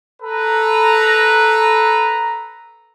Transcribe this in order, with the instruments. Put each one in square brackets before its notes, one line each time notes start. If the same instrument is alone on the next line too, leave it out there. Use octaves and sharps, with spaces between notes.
[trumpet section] A4 B4 A#5